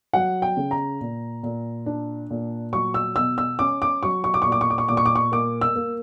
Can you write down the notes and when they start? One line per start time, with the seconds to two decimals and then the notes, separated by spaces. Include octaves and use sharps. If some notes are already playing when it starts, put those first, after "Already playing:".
0.13 F#3 F#5
0.42 G5
0.57 C#3
0.71 A#5
1.01 A#2
1.43 A#2
1.86 D4
2.30 A#2
2.73 F#3 C#6
2.94 E6
3.16 B2 E6
3.38 E6
3.59 C#4 D6
3.82 D6
4.03 F#3 C#6
4.24 C#6
4.34 D6
4.42 A#2 C#6
4.52 D6
4.61 C#6
4.70 D6
4.78 C#6
4.88 A#2 D6
4.97 C#6
5.06 D6
5.15 C#6
5.32 A#3 D6
5.61 E6
5.76 A#3